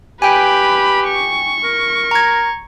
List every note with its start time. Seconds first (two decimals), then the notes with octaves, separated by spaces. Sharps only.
0.22 G4 B4 G5 G#5 B5
1.08 C#6
1.64 A#4
2.11 A#5 G#6